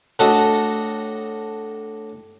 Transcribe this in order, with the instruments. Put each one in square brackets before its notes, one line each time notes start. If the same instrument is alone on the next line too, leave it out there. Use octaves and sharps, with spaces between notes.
[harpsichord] A2 D4 F#4 A4 D#5 D#6